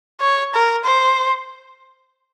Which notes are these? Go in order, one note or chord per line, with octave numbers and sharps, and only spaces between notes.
C#5
A#4
C5